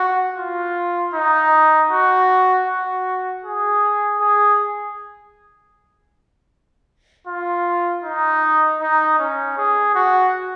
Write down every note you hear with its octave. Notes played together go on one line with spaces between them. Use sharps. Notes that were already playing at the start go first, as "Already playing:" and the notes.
Already playing: F#4
F4
D#4
F#4
F#4
G#4
G#4
F4
D#4
D#4
C#4
G#4
F#4